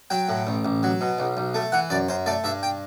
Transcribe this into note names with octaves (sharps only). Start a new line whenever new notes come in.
F#3 G5
A2
A1
A1
F#3
B2
B1
B1
A3
E3 F#5
F#2 D5
F#2 C5
A3 D5
G2 E5
G5